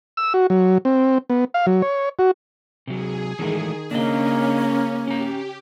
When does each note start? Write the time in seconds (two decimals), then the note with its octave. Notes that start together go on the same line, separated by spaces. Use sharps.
0.17 E6
0.34 F#4
0.50 F#3
0.85 C4
1.30 B3
1.54 F5
1.67 F#3
1.82 C#5
2.19 F#4
2.87 C3 F#3 G#4
3.39 D#3 E3 G#3 A3
3.91 C#3 A#3 C#4 D4 D#5
5.07 C#4 G4 A#5